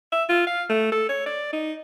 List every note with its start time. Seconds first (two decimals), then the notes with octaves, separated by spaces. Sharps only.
0.12 E5
0.29 F4
0.47 F5
0.70 A3
0.92 A4
1.09 C#5
1.26 D5
1.53 D#4